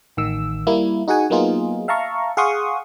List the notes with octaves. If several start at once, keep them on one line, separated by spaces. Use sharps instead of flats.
A1 D#3 E6
G3 A#3 E4
D#4 F#4 G#4 F#5 G#5
F#3 A#3 B3 D#4 F4 G#4
E5 F5 A5 A#5 C#6
G#4 F5 F#5 C6 C#6 D#6